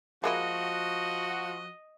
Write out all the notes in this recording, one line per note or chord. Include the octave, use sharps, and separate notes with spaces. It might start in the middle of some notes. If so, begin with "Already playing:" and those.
F3 G#3 A#3 E4 F#4 D#5